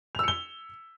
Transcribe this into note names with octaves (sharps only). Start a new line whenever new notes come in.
E6 C#7 F7 G7